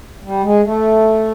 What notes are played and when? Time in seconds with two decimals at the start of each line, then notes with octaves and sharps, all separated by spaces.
0.24 G3
0.43 G#3
0.64 A3